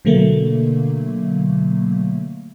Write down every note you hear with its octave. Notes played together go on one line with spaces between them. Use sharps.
B2 D3 F#3 A3 A#3